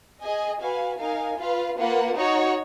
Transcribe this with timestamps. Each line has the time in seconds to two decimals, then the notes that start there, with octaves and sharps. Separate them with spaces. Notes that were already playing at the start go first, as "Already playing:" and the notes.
0.20 G#4 D#5 G#5
0.60 F#4 B4 F5 G#5
0.98 D#4 A#4 F5 G#5
1.38 F4 B4 F5
1.76 A#3 F4 B4 F#5
2.15 D#4 F#4 C#5 F#5